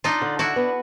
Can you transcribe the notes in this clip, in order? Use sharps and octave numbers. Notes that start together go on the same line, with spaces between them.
D4 D#4 F4
D3
D4 E4 F#4
B3